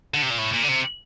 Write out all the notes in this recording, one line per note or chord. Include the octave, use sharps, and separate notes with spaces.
D3
C3
A#2
A2
A#2
D3
C3